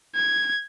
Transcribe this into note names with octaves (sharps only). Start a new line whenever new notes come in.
G#6